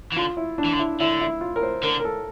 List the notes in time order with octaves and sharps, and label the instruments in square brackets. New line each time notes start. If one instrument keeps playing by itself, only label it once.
[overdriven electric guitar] E3
[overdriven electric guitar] D3 [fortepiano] F4
[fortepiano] E4
D4
[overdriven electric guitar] E3
D3
[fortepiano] E4
[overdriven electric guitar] D3 [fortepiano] E4
[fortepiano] E4
F4
A#4
C5
[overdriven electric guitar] D3 [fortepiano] A#4
[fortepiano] A#4
A4